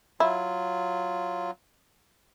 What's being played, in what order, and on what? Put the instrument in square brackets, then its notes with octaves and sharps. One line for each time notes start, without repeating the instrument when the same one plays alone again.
[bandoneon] F#3 F4 [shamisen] E4